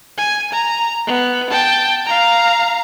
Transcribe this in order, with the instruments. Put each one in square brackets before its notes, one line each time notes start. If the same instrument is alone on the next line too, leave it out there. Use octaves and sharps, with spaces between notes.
[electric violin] G#5
A#5
B3
G5 A5
F5 A#5